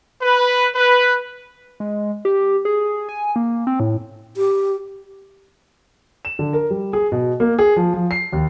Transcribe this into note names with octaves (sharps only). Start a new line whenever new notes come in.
B4
B4
G#3
G4
G#4
G#5
A#3
C4
A2
G4
E7
D3
A#4
G3
G#4
B2
A#3
G#4
F3
F3
C7
D#2